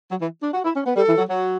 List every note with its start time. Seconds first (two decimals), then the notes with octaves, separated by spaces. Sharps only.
0.11 F#3
0.21 E3
0.43 D4
0.54 F#4
0.64 E4
0.75 C#4
0.86 B3
0.96 G3 A4
1.08 E3
1.18 F#3
1.29 F#3